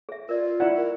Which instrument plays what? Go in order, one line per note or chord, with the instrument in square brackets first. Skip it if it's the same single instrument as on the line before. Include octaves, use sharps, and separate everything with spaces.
[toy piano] G#4 E5
[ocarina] F4 [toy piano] A#4 D5
[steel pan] E4 E5 F#5 [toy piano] D5 A#5
[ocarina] A#4